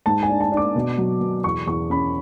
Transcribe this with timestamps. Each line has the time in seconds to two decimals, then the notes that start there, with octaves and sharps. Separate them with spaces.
0.06 G#2 A5
0.23 G#5
0.29 D4
0.41 A5
0.52 D4
0.57 D6
0.76 B2
0.98 F#3
1.21 B2
1.44 E2 C#6
1.67 E2 C#6
1.90 C#4 B5